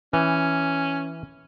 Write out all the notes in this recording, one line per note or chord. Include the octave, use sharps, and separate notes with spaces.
E3 C#4